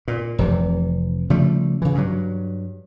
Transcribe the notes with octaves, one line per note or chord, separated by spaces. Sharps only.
A#2
F1 C3 E3
C#3 F3 G3 A3
C#3 E3
G2 F#3